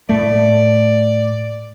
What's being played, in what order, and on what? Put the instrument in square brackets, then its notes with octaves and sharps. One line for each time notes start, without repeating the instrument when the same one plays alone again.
[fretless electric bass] A2 A3 [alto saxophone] D5